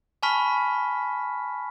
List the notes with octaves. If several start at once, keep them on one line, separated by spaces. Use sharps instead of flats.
G#5 A5 B5 C#6 F6 B6